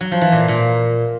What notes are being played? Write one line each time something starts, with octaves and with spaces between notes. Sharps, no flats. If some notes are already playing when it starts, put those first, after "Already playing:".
F#3
F3
E3
A#2
A#2